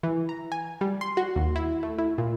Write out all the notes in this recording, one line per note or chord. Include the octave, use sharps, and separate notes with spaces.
E3
A#5
G#5
G3
C6
F#4
D#2
E4
A3
E4
A#2